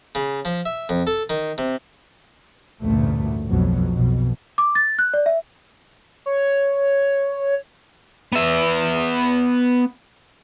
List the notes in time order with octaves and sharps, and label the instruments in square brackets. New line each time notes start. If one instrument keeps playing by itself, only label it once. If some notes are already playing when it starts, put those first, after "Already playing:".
[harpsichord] C#3
F3
E5
F2
A4
D#3
C3
[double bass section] A1 D2 G2 A#2 A3
B1 F2 B2 F#3
B1 F2 B2
[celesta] D6
A6
F#6
D5
E5
[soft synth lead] C#5
[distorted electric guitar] B3 E5